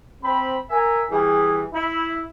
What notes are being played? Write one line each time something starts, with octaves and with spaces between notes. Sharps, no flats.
C4 B5
A#4 E5 G#5
E3 G3 G#4
E4